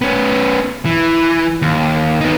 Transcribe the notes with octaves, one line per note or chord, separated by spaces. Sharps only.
B3 C#4
E3
D#2
B3 D#4